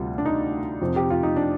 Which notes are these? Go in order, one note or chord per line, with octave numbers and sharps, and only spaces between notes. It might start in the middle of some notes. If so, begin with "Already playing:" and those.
Already playing: D2 C3 G3 F4
D4
D#4
F2 C3 F3
G4
F4
D#4
D4